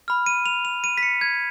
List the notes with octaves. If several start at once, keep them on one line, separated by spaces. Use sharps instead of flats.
B5 F6
D#7
F7
F7
D#7
B6
C#7
G#6